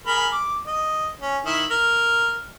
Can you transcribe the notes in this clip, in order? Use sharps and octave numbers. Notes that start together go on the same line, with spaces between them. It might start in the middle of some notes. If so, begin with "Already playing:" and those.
G#4 A#4 B5
D6
D#5
C#4
D#3 E4
A#4